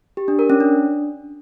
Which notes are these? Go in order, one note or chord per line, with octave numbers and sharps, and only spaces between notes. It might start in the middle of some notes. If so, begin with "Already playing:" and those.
G4
D4
A#4
C#4
D4